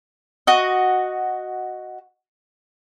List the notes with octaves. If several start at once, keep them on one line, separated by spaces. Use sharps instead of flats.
F#4 D#5